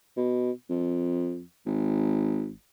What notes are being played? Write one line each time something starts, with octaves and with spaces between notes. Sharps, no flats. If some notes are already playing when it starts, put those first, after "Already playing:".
B2
F2
G#1